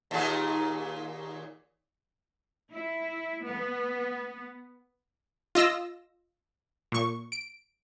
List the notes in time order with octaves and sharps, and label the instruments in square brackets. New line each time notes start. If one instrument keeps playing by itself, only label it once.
[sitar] D#2 A#2 G#4
[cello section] E4
B3
[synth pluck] F4 D#5 E6 A#6
A#2 C#6
D7